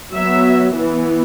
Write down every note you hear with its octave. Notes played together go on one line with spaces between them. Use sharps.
F#3 B3 E5
E3 B3